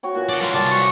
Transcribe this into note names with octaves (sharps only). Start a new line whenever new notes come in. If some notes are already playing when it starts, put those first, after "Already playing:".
F#4 C#5 G5
A#2 E3 F#4
G#4 A4 D5 F#5
G3 F4 A#4
C2 C#3 D5 G5 A5
F#4 C#6